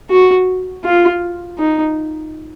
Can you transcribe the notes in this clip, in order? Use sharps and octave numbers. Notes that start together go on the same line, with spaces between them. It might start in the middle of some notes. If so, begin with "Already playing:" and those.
F#4
F4
D#4